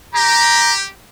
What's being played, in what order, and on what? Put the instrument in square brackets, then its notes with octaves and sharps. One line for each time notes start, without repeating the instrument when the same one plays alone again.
[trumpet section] G4 [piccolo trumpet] A#5